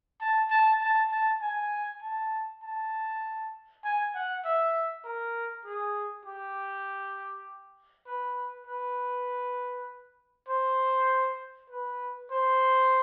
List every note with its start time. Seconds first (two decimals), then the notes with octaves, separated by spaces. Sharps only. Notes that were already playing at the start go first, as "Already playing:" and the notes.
0.21 A5
0.50 A5
0.81 A5
1.11 A5
1.42 G#5
2.02 A5
2.62 A5
3.84 G#5
4.14 F#5
4.45 E5
5.05 A#4
5.65 G#4
6.26 G4
8.06 B4
8.67 B4
10.49 C5
11.70 B4
12.31 C5